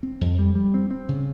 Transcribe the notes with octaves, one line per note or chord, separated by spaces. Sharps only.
C4
F2
G3
G3
C4
C4
C#3